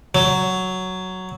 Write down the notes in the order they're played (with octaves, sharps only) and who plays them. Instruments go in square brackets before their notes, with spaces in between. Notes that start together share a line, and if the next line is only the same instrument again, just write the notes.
[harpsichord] F#3